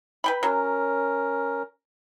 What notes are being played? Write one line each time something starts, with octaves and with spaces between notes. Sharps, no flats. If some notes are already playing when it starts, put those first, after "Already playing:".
B4 G5 B5
F#3 C#4 A#4